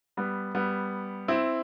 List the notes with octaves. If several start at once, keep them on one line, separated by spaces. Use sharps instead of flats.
G3 B3
G3 B3
C4 E4